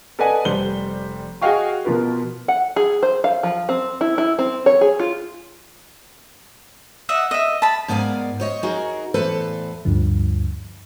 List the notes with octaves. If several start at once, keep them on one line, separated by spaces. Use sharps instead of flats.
A4 B4 D5 D#5 F#5 G#5
F1 G3 C5 G7
F#4 G#4 D#5 F5 G5 C#6
B2 F3 F4 A#4 B4
F#5
G#4
C5
F5
F3
C4
E4
E4
C4
C#5
G#4
F4
D#5 E5 F#5
D#5 E5
A5 B5
G#2 B3 A#4 D5 F5 G#5
C5 C#5 D#5
D#4 F#4 G#4 A#4
E2 A2 A4 B4 C5
D2 G2 D3 F3